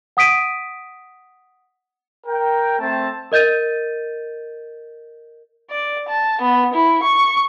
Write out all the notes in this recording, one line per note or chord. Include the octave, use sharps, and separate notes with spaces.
F#5 D#6 B6 D7 D#7
A#4 G5
A3 C4 A5
A#4 D#5 G6 A6 D#7
D5
A5
B3
E4
C#6